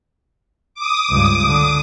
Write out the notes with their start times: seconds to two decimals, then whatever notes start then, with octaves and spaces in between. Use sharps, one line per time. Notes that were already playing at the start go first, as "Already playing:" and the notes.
0.75 D6 D#6
1.10 C#2 G2
1.48 D3